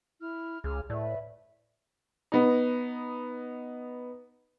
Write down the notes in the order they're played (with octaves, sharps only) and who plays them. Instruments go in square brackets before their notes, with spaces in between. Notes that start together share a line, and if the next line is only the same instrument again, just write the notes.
[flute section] E4 F6
[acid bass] C#2 [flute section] G#4 D6 F6
[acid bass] A2 [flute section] B4 D5 E5
[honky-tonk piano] B3 D#4